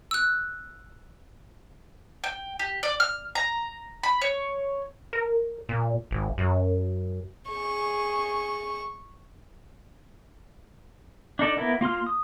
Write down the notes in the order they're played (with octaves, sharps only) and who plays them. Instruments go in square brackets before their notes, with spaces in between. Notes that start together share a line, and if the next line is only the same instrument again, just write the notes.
[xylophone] E6 F#6
[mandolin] G5
G4
D5
F6
A#5
B5
C#5
[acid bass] A#4
A#2
G#1
F#2
[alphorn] G#4 [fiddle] C#6
[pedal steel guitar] D4 D#4 A4 D5
A#3 B3 E4 A#4
A#3 F4 C6 F6
D#6